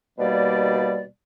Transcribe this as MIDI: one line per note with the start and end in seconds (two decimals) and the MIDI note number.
0.19 1.06 39
0.19 1.06 47
0.19 1.06 55
0.19 1.06 58
0.19 1.06 74